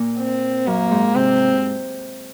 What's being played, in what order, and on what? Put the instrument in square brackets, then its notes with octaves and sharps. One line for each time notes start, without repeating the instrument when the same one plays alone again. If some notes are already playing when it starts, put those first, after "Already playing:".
Already playing: [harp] A#2
[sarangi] C4
[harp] F#2 [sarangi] A#3
[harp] G#2
[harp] C3 [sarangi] C4